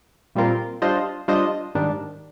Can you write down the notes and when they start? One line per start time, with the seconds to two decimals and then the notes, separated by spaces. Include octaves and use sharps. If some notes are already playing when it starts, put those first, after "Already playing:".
0.35 A#2 G3 C4 F4 A#4
0.82 G3 D4 F4 C5 D#5
1.28 G3 D4 F4 C5 D#5
1.75 G#2 D#3 G3 D4